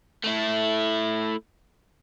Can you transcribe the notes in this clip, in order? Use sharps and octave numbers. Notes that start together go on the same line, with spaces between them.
A3 E4